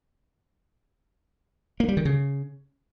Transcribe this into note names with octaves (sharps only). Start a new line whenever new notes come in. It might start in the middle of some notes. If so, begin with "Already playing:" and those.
A#3
G3
D#3
C#3